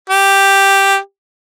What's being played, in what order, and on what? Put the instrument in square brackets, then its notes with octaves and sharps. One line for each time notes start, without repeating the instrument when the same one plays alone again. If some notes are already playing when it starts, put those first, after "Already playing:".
[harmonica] G4